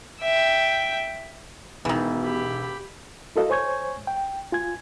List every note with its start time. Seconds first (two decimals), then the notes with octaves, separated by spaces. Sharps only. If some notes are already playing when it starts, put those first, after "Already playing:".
0.21 E5 G5
1.85 E1 B2 D#3 E3
2.23 G4 B5
3.36 E4 F#4 A4 A#4 D#5 F5
3.50 C5 C#5 G#5 C#6 G6 G#6
4.07 G5
4.52 F4 G#5 G#6